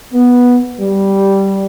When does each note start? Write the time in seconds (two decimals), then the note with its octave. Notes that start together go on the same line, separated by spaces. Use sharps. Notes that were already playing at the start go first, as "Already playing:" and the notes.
0.12 B3
0.79 G3